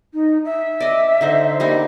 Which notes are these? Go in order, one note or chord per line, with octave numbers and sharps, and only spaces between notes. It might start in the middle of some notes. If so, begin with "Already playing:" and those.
D#4
E5
D5 D#5
D3 D#4 C5
G3 A#3 D#4